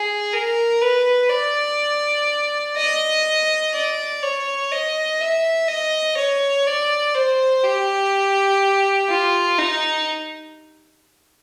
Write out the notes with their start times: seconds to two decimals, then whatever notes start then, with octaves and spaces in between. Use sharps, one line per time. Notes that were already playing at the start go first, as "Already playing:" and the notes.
Already playing: G#4
0.33 A#4
0.81 B4
1.30 D5
2.77 D#5
3.74 D5
4.22 C#5
4.72 D#5
5.20 E5
5.68 D#5
6.17 C#5
6.66 D5
7.15 C5
7.63 G4
9.09 F4
9.58 D#4